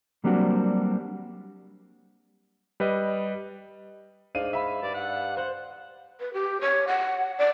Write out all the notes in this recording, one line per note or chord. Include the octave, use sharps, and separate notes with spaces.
F#3 G3 A#3 C4 D4 F#4
G3 B4 D#5
G#2 D4 F5 D#7
E5 F5 B5
G2 D5
F5 F#5
C5 F#5
B4
G4
C#5
F#5
D5